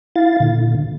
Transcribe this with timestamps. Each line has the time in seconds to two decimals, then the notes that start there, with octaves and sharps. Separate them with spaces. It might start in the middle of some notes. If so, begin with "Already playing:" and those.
0.16 E4 F5 A6
0.40 A#2 D3